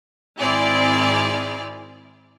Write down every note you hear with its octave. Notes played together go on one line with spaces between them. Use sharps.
G#1 C4 E4 G#4 D5 F6